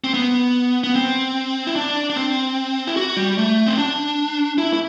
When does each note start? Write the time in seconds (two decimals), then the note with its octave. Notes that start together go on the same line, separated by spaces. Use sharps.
0.04 C4
0.14 B3
0.84 B3
0.96 C4
1.67 E4
1.76 D4
2.10 D4
2.16 C4
2.87 E4
2.97 F#4
3.17 G3
3.38 A3
3.66 C4
3.78 D4
4.58 E4
4.73 E4